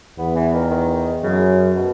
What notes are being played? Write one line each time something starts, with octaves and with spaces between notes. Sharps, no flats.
E2 B3
E3
D#3
D#3
F#2 C#3
B2